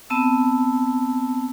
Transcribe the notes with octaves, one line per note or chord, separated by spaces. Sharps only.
B3 C4 A5 E6